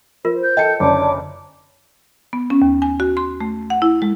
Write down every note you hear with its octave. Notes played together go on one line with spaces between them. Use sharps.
F4 A#4 C5
G6
A4 D#5 G5 A5 C#7
F#1 D3 C#5 D5 A5 D6
B3
C#4
D#2
G#5
F#4
C6
A3
F#5
E4
G#3